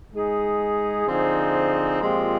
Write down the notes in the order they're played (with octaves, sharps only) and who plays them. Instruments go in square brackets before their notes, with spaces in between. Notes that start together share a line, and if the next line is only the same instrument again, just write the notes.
[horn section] G#3 D#4 G#4
D3 F3 C4 D#4 G#4
A#2 F3 G#3 C4 G4